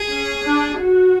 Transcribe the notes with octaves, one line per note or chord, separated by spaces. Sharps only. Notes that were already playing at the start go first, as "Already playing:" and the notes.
Already playing: G#4
C#4
D4
F#4